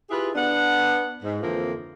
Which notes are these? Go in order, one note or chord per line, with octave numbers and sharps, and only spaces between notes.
E4 F4 G4 G#4 B4
B3 D4 F#5
G#2
F2 D3 E3 F3 A#3 C4